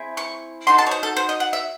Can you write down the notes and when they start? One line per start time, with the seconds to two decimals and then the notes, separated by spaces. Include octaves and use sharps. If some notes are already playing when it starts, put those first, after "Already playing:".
Already playing: C4 E4 G#4
0.17 C#6
0.67 D#4 F#4 A4 C6
0.78 A5
0.87 C#5
0.91 C5
1.03 A4
1.17 C5
1.29 D#5
1.40 F#5
1.53 E5